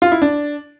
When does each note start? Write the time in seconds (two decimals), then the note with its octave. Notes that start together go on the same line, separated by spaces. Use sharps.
0.02 F4
0.12 E4
0.22 D4